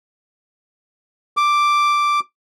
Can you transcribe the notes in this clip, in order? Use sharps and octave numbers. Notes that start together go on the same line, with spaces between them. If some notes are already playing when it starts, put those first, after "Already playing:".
D6